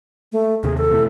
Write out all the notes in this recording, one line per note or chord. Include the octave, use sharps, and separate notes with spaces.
A3
D#2 C3 G#4
A4
E2 B2 A3